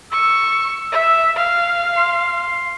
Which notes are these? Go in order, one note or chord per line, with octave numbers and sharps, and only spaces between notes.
C#6 E6
E5
F5
C6